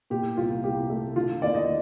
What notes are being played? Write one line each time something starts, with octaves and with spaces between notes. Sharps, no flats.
A#2 G4
C2 F4
C2 G4
A3
D3 F4
D#2 D5
D#5